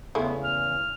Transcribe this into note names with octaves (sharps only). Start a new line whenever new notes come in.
E2 C#3 G#3 A3 B3 E4
F6